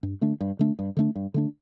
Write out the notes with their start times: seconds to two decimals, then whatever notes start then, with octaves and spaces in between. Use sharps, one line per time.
0.03 G2
0.21 D3 A3 D4
0.41 G2
0.59 D3 A3 D4
0.79 G2
0.97 D3 A3 D4
1.15 G2
1.34 D3 A3 D4